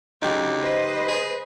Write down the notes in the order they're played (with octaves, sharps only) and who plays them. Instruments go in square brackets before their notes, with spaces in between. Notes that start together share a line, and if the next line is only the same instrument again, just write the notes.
[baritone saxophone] D2 [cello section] C#3 F#3 [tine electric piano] D#4 G4
[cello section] B4 C5 D#5
[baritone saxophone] G#4